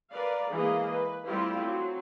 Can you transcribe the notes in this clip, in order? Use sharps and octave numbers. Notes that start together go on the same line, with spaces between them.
A#4 B4 D5 F5
E3 G#3 A#3 G#4 D#5
B4
G3 A3 C4 E4 F4 G4
F#3 C4